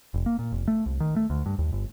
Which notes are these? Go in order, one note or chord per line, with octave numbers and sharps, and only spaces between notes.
F1
A#3
A#2
F1
A3
C2
D#3
A3
D2
G2
D#2
G1